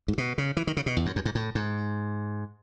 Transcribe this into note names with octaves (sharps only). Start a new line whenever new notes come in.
G#2
B2
C#3
E3
D#3
C#3
B2
E2
F#2
F#2
G#2
A2
G#2